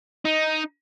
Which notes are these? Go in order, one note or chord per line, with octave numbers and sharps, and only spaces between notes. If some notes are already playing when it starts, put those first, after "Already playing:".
D#4